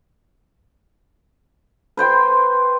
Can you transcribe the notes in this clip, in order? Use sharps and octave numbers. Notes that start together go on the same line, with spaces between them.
B4 C5 G5 C6